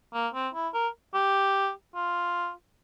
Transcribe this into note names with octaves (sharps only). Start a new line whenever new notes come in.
A#3
C4
E4
A#4
G4
F4